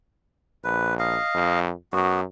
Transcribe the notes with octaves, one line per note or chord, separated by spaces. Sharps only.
A#1 B4
D#5 F5
F2
F#2 B3 F#4